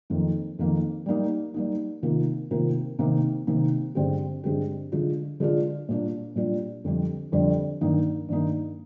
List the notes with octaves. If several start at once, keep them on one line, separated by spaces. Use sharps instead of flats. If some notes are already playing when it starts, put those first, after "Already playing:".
F2 D#3 A#3
F2 D#3 A#3
G3 A#3 D#4
G3 A#3 D#4
C3 D#3 A#3 F4 A#4
C3 D#3 A#3 F4 A#4
C3 D#3 A#3 D#4
C3 D#3 A#3 D#4
G2 D3 G#3 C4 G4
G2 D3 G#3 C4 G4
D3 G#3 D4 F4
D3 G#3 D4 F4
A#2 G3 D4 F4
A#2 G3 D4 F4
F2 D3 G3 D4
F2 D3 G3 D4
G2 D#3 A#3 D#4
G2 D#3 A#3 D#4